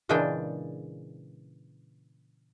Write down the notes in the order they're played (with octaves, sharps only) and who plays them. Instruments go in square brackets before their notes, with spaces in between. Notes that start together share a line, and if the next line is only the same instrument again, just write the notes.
[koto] A#2 C#3 E3 G#3 D4 G5